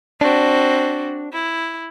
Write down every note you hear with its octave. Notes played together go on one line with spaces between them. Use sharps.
C4 D4 F#4
E4